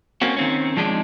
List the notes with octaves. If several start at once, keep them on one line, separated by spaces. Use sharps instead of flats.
A#3 C4 C#4 F#4
D#3 C4 C#4
F3 G#3 D4 D#4